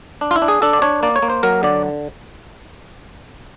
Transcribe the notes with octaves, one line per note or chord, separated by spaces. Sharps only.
D4
F4
E4
D4
G#4
D4 A4
D5
D4 C#5
A#3 D5
C#5
A#3
C5
F#3 A#4
D3 D5